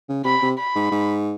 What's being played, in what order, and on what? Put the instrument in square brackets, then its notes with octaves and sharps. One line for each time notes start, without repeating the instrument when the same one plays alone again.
[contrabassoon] C#3
[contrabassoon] C3 [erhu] B5
[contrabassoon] C3
[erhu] B5
[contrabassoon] G#2
G#2